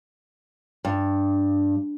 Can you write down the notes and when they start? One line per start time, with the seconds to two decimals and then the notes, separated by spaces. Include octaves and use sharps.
0.85 G2